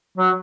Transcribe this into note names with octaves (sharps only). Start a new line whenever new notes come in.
F#3